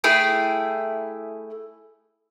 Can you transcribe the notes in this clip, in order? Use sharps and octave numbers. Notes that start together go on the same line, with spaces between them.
A3 E4 G#4 G5